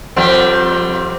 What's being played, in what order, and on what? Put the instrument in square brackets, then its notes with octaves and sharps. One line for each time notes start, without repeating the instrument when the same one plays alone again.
[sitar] F2 G3 C4